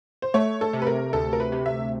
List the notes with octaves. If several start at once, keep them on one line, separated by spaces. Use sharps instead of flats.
C5
A3 C#5
A4
C3
B4
A#4
D2 A4
A#4
B4
C3
E5